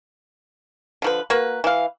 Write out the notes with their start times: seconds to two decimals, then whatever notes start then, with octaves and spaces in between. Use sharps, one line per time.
1.02 D3 F3 B4
1.30 A#3 F#4 B4
1.64 E3 F5